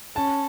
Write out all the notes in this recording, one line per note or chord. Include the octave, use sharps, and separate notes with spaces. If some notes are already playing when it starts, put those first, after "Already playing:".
C#4 A5